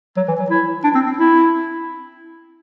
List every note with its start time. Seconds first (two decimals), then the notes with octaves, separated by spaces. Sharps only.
0.17 F#3
0.28 E3
0.39 F#3
0.50 E4
0.84 D4
0.95 C4
1.06 C4
1.17 E4